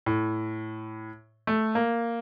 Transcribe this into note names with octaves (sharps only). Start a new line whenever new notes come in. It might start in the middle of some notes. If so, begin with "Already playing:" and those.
A2
A3
A#3